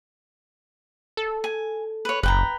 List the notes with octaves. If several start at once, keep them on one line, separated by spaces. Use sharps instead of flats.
A4
G#5
B4 C#5
F#1 B4 G5 A#5